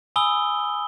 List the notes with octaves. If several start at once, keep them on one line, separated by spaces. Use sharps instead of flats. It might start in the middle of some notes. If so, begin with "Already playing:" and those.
G#5 B5 D#6 E6 G7